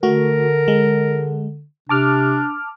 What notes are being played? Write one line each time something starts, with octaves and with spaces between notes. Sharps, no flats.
D3 A3 F#4 A#4
G#3
C3 D4 A5 D6 F6